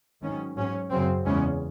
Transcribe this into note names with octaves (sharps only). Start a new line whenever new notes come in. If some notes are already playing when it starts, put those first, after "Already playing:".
G#2 D#3 F#3 C#4
G#2 F#3 C#4
F#2 C#3 F#3 C4
E2 C#3 G#3 C#4